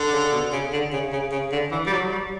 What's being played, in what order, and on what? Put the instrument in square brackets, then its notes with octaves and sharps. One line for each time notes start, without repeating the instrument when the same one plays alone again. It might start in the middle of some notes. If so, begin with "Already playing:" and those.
Already playing: [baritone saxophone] D3
[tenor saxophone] C#3
B2
C#3
D3
C#3
C#3
C#3
D3
E3
G3
F#3
G3